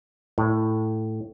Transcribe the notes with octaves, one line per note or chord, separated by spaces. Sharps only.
A2